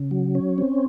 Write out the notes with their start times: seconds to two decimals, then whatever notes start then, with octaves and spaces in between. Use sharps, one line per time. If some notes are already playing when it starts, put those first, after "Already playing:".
Already playing: C#3
0.11 F#3
0.35 C#4
0.58 C4